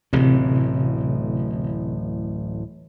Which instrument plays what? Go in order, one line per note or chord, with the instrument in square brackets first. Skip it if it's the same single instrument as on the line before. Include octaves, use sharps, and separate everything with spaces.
[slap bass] D1 A1 A2 [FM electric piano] C3